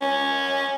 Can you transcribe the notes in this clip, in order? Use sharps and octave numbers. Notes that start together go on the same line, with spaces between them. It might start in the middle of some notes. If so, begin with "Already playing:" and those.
C#4